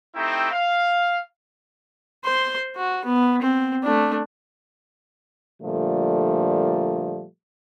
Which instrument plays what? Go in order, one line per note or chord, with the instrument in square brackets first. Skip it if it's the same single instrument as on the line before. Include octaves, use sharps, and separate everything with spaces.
[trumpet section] A3 C4 D#4 E4 G4 G5
F5
[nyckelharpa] C5 C6
F#4
B3
C4
A3 D4
[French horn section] A#2 D3 F3 G3 A3